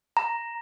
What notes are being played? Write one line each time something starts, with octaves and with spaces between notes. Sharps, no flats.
A#5